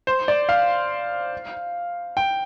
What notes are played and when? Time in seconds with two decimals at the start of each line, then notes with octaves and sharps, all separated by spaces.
0.07 C5
0.28 D5
0.49 F5
2.17 G5